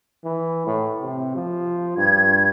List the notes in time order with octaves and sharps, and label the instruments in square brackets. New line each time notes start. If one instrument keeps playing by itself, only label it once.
[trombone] E3
A2
C3
F3
[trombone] G2 [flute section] G#6